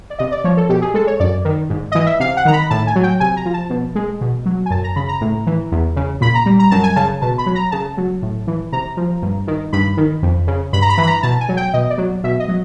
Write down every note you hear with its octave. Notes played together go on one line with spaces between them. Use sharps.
D5
C3 D#5
D5
F3 C#5
A4
B2 G4
G#4
G#3 A4
C#5
F#2 D5
D#3
G#2
E3 D#5
E5
C3 F5
F#5
D#3 A#5
B5
A2 A5
G#5
F#3
G5
C3 G#5
A#5
F3
A5
B2
G#3
B2
F#3
G#5
F#2 A5
A#5
C#3 B5
A#5
A2
E3
E2
C#3
A#2 B5
A#5
G3
A#5
F#2 A5
G#5
C#3 A5
B2 A5
B5
F#3
A#5
C#3 A5
F#3
A2
E3
C3 A#5
F3
G2
D#3
G2 B5
D#3
F2
C#3
G2 B5
A#5
B5
E3
B5
A#5
B2 A5
G#5
F#3
G5
B2 D#5
D5
F#3
B2 E5
D#5
F#3